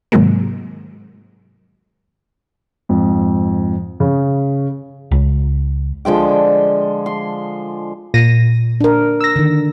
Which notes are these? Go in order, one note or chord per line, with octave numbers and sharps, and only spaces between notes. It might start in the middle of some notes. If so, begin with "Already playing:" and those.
G#2 C3 D#3 F#3 G#3 A#3
F2 G#2
C#3
C#2
D3 F3 G#3 G5
C6
A#2 A#6 D#7
D4 A#4
E6 A#6
D3 D#3